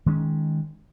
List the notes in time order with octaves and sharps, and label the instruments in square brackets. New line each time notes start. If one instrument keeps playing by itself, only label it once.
[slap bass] D#3 G#3 C4 C#4